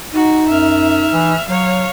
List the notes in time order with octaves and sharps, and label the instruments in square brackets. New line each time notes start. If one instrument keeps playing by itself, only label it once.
[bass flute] D#4 [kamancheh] F#4
[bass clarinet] F#2 [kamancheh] E5 F6
[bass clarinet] E3
[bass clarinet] F#3 [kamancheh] C#5 F5